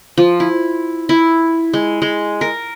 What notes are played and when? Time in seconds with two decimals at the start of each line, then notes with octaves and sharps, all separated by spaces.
0.18 F3
0.40 E4
1.09 E4
1.74 G#3
2.02 G#3
2.41 A#4